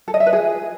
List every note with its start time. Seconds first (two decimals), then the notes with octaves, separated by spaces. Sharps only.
0.08 A4
0.14 D#5
0.20 E5
0.26 B4
0.33 G#4